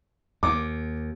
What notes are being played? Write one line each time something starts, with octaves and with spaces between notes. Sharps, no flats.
D#2 D6